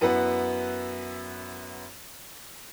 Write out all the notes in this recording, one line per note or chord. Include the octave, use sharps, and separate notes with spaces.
F#2 B3 E4 B4 F#5